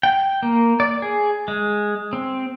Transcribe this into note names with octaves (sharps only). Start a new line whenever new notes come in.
G5
A#3
D5
G#4
G#3
C4